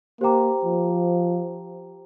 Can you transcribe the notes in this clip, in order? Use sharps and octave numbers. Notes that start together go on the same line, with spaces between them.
A#3 G4 C5 G5 A#5 D6
F3